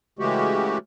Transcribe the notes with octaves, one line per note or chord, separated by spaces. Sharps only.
C#3 E3 G#3 A3 F#4 G4